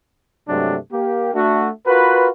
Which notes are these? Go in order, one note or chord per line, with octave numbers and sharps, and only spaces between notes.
G2 C3 F#3 G#3 A3 D4
A#3 G4
A3 D4 F#4
F4 F#4 A#4 B4